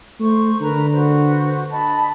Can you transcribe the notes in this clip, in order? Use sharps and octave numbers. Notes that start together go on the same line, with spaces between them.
A3 C5 C#6
D3 A#4 B4 A#5
F#4 B4 C5
D#5 A5 B5